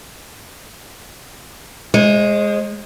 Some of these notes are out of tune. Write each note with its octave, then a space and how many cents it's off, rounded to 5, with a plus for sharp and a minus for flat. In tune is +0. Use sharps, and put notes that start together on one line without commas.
G#3 -5 C5 +40